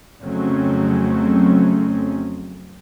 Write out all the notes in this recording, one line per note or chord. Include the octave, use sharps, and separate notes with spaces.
F2 C#3 F#3 A3 C4 C#4